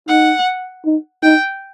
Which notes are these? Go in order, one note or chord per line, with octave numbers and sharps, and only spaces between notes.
D#4 F#5
D#4
D#4 G5